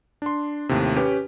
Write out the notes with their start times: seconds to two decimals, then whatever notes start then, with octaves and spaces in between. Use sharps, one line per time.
0.22 D4 C6
0.69 D#2 A2 C3
0.96 C#4 G4 B4